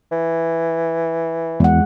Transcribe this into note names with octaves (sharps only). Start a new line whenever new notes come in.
E3
E2 G#3 F#5